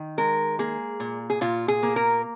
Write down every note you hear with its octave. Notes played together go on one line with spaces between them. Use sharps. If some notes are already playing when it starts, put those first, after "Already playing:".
Already playing: D#3
G#3 A#4
A#3 G#4
A#2
G#4
A#2 F4
G#4
A#3
A#4